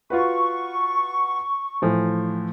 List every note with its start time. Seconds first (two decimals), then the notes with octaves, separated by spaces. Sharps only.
0.10 F4 F#4 B4 C#6
1.82 A2 E3 F3